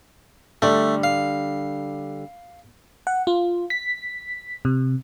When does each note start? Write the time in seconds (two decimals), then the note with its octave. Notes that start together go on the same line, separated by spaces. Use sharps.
0.62 D3 G3 A3
1.04 F5
3.07 F#5
3.27 F4
3.70 B6
4.65 C3